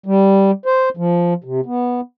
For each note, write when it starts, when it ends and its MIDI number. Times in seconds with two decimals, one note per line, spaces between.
0.06 0.51 55
0.66 0.89 72
0.97 1.34 53
1.44 1.61 48
1.66 2.01 59